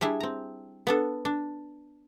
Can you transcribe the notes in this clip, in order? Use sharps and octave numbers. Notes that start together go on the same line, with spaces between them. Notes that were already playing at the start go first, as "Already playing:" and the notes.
G3 D4 E4 G#4
C4 A#5
B3 D4 A4
D4